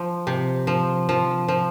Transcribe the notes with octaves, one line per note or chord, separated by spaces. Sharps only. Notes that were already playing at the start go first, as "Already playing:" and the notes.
Already playing: F3
C3
F3
F3
F3